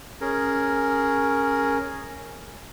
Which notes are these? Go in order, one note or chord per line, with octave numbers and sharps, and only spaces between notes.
C#4 G#4 A#4